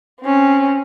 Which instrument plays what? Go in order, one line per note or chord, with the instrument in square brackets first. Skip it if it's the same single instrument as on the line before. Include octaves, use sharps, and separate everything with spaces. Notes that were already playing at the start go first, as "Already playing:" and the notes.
[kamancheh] C4 C#4